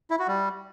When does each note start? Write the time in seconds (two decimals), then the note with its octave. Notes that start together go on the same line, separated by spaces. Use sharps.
0.11 E4
0.19 F#4
0.28 G3